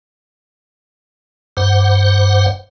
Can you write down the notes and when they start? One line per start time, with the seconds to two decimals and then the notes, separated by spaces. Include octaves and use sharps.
1.57 G2 C5 F#5